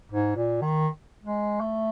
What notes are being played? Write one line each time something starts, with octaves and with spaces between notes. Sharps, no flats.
G#2
A#2
D#3
G#3
A3